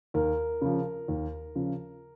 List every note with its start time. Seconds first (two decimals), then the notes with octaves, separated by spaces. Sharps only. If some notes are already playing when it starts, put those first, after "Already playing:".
0.14 D#2 A#4
0.61 C#3 F3
1.08 D#2
1.55 C#3 F3